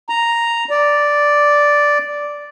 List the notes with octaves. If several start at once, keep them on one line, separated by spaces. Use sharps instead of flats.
A#5
D5